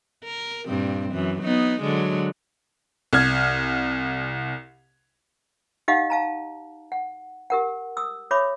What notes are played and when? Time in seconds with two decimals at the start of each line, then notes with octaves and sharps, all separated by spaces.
0.24 A#4
0.67 G2 A#2 C4
1.11 F#2 E3
1.42 F#3 B3 D#4
1.81 D3 F#3 G#3
3.13 C2 F6 G#6
5.88 D#4 G4 D#5 F5 F#5
6.10 F5 A5 A#5
6.92 F#5
7.50 G4 A#4 F#5
7.97 D#6 E6
8.31 G4 C#5 E5 B5 D6 D#6